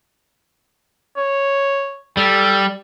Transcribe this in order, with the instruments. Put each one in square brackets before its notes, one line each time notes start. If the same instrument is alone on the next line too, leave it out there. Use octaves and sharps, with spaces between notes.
[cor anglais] C#5
[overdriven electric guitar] G3 [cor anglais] A4